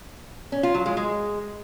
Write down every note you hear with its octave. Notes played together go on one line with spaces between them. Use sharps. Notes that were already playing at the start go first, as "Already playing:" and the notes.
C#4
F4
F#3
G#3
G#3